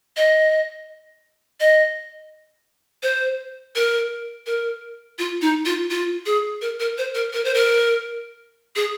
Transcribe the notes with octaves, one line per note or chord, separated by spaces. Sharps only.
D#5
D#5
C5
A#4
A#4
F4
D#4
F4
F4
G#4
A#4
A#4
C5
A#4
A#4
C5
A#4
G#4